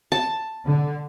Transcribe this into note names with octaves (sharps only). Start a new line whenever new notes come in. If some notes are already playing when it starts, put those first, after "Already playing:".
A5
D3